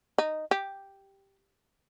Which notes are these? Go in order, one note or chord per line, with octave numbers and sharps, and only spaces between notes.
D#4
G4